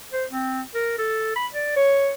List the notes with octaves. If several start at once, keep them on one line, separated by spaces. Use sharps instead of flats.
C5
C4
A#4
A4
B5
D5
C#5